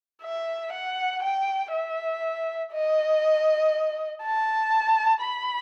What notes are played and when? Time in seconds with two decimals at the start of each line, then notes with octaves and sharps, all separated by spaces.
0.23 E5
0.73 F#5
1.23 G5
1.72 E5
2.72 D#5
4.23 A5
5.22 B5